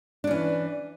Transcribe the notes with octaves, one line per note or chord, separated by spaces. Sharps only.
E3 C#4 D4